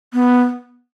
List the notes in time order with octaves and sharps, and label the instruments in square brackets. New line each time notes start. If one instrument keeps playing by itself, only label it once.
[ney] B3